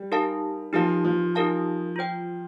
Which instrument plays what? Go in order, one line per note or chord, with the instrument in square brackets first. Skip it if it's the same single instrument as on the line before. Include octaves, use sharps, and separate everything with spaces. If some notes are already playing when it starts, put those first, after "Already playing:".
Already playing: [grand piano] G3
[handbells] D#4 G4 A#4 F5 A5
[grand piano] F3 [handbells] D#4 G4 A#4 F5 A5
[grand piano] F3
[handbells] D#4 G4 A#4 F5 A5
F4 C5 G5